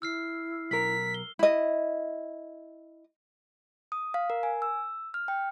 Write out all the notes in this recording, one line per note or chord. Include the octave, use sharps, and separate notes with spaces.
E4 E6 F6 C7
B1 A#4 B6
G7
E4 D#5
D#6
F5
A#4
G#5
E6
F6
G5